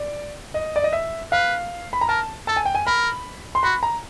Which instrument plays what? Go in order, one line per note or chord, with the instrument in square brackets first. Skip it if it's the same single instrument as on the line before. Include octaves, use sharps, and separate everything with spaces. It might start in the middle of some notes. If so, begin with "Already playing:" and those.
Already playing: [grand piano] D5
D#5
D5
D#5
E5
[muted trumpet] B4 [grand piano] F5
[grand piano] B5
A#5
[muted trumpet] A#4 [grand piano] A5
[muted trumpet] A4 [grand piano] A5
[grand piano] G#5
G5
G#5
[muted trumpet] A#4 [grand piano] B5
[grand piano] C6
[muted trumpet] F#4 [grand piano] B5
[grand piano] A#5